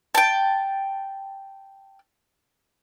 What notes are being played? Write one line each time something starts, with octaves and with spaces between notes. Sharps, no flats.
G5 A5